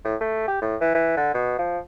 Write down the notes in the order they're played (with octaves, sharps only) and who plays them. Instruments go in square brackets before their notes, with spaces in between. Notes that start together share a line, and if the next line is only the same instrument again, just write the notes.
[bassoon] A2
A3
G4
A2
E3
E3
D3
B2
F3